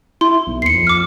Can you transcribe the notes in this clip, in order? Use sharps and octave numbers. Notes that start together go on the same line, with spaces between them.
E4 C6
B1
D#2 C7 C#7
F2
D6 F6